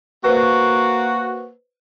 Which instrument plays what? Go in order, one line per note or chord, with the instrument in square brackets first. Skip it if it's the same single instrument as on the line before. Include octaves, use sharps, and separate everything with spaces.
[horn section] A#3 F#4 [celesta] B4 C5